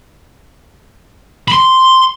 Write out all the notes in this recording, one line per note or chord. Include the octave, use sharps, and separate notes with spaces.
B5 C6